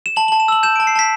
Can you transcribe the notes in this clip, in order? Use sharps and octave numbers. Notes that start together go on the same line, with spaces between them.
E7
A5 F#7
F#7
A5
E7
E6 F#7
G6 E7
D7
A5
C7
A5 B6